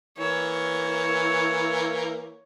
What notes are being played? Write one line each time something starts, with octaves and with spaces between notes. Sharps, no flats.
E3 A#3 C#5